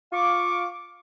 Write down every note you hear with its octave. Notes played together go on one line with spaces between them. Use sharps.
F4 F5 C#6 D6